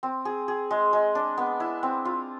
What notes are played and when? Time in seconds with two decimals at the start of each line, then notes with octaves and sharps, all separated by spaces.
0.03 C4
0.25 G#4
0.48 G#4
0.71 G#3
0.93 G#3
1.15 D4
1.38 B3
1.60 E4
1.83 C4
2.05 F4